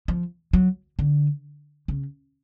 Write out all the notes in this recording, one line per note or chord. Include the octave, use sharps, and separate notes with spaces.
F3
F#3
D3
C#3